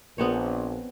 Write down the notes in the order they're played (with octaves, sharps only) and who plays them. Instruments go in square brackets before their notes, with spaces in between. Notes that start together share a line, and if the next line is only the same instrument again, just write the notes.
[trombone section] A#1 [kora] B3 C4 C#5